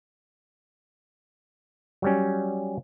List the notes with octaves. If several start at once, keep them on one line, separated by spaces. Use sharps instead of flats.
F#3 G3 C#4